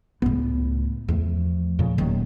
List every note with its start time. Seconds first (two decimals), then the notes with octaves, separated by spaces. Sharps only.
0.22 C#2 A2 B3
1.08 E2 F3 A3
1.79 F2 A#2 C#3
1.98 D#1 D#3 F#3